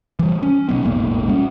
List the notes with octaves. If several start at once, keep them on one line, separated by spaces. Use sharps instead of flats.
E3 G3
C#4
B2 F#3 B3
E1 A1 G#2 A#3
G3 C#4